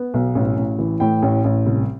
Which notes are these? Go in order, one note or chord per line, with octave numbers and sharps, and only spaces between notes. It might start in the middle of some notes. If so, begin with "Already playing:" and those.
Already playing: B3
B1
A1
A1
E3
A2 G5
A1
A1
C2